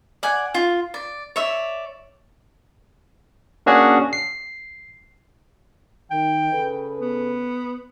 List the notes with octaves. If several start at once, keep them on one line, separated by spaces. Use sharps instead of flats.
D5 F#5 G#5
F4
D5
C#5 D5 E5
A#3 C#4 D4 F#4 G#4
C7
D#3 G5
C#3 A4 B4
B3